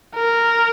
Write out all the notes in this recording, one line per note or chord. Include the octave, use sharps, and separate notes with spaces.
A#4